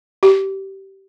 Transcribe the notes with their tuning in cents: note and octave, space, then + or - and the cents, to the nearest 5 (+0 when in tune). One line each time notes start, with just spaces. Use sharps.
G4 -20